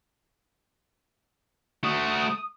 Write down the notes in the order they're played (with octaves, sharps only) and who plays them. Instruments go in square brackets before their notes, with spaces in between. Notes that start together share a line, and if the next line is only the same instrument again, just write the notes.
[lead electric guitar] A3 F#4 [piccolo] D#6